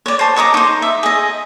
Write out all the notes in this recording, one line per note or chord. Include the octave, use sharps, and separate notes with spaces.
C#5 D5
C5 A5
C#5 D#5 A#5 D6
D#4 C5
E5
G#4 D#5